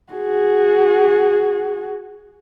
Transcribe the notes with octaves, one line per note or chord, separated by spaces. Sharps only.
F#4 G#4